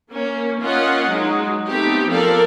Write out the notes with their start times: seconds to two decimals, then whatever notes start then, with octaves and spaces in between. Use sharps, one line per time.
0.11 A#3 C#4
0.61 A#3 C#4 F4 D#5 F#5
1.09 F#3 G#3 D#4
1.69 A3 B3 C4 D#4 G4
2.10 F3 A4 A#4 D5 F5